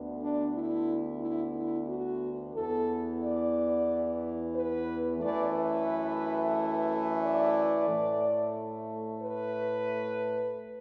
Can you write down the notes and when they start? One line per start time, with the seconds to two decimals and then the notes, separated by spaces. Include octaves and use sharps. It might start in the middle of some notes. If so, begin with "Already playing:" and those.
Already playing: D2 D3 B3
0.20 D4
0.54 E4
1.20 E4
1.54 E4
1.87 F#4
2.54 E2 E3 B3 A4
3.20 D5
4.54 B4
5.20 F#2 E3 A3 D5
5.54 B4
7.21 D5
7.88 A2 A3
9.21 B4